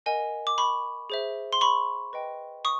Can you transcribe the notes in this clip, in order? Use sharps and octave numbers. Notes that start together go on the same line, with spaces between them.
A#4 D#5 F#5 G#5
D6
B5 C#6
G#4 C5 E5
C6
B5 C#6
B4 D#5 G5
C#6 D#6